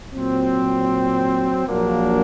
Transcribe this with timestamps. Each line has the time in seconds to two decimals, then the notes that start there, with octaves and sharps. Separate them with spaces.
0.14 A#2 F#3 C4
1.67 A#1 A#2 F#3 A#3 D4